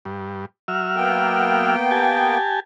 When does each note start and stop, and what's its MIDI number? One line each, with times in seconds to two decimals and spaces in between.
0.05 0.46 43
0.68 1.76 54
0.68 1.76 76
0.68 1.76 89
0.96 2.37 58
0.96 2.37 59
0.96 2.37 79
1.91 2.60 67
1.91 2.60 80
1.91 2.60 81